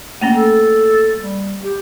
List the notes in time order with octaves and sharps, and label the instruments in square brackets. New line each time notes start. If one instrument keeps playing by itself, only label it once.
[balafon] A3 A#3 C#4
[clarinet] A4
G3
G4